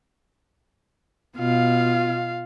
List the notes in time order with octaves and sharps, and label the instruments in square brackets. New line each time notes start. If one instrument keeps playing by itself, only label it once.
[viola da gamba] B2 [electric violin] F4 F5